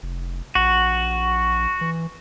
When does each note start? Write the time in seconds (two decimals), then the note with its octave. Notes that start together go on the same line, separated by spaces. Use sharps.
0.03 F1
0.55 A#1 F#4
1.81 E3